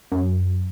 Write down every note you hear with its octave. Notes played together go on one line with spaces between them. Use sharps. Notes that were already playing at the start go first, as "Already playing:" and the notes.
F#2